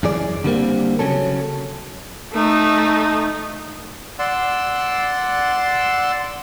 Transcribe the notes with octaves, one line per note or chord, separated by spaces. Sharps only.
F#2 E3 G#4 D5
D3 G3 A#3 C4
C#3 F#3 C#4 A4
A3 D#4
D5 F#5 C6 E6